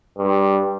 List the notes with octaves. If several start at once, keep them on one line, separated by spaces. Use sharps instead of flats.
G2